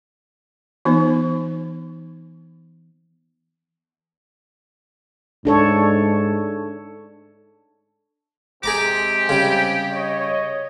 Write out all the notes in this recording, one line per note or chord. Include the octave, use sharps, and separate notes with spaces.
E3 B3 D#4 C5
G#2 D4 A4 C#5
C3 G#3 C4 G4 G#4 A#5 D6
C#3 G3
C#5 D#5